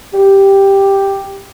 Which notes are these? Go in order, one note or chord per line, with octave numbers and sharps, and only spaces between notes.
G4